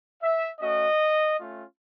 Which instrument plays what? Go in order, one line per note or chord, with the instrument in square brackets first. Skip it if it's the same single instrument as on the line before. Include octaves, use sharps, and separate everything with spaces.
[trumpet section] E5
A3 C#4 F#4 D#5
A3 C#4 F4